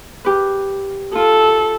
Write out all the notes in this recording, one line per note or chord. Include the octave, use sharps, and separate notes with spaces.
G4 B4
F4 A4